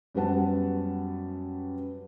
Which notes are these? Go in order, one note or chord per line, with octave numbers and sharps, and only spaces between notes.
F#2 G3 B3 B4 F#5 A5